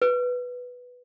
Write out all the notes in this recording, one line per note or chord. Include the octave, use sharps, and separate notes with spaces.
B4